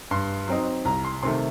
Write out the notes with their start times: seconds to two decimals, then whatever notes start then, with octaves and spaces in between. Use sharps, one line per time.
0.11 G2 C6
0.48 F#3 C4 D#4
0.85 C2 A#5
1.05 C6
1.23 C3 D#3 A3 C6